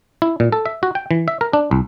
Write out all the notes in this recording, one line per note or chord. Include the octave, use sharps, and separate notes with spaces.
E4
A#2
A4
E5
F#4
G5
E3
E5
A#4
D4
C2